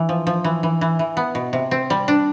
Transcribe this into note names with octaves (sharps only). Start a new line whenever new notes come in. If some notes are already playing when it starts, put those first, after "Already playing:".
Already playing: E3
F3
F3
E3
E3
E3
E3
B3
B2
C3
C4
G3
D4